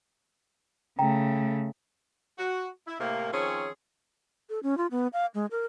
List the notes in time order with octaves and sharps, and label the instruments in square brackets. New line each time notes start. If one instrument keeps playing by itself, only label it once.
[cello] C#3 A3 [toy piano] G5 A#5
[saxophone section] F#4
E4
A2 C3 A#3
D#3 F3 C4 C#4 G#4 C#5
[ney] A4
C#4
F4
B3
F5
G#3
A#4